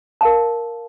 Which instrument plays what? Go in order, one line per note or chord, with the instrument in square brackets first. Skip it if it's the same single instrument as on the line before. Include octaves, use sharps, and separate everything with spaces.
[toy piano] A#4 F5 A5